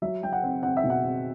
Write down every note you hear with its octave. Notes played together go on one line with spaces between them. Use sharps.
F#3 E5
F#3 G5
F#5
C4
C4 F#5
E5
B2
F#5
C4